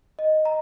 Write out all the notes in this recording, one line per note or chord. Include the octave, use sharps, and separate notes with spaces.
D#5
A#5